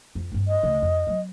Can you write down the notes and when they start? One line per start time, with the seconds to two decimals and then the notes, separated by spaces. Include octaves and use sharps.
0.15 F2
0.32 G2 C4
0.48 D#5
0.63 D2 C#3
0.82 F2
1.07 F#3 B3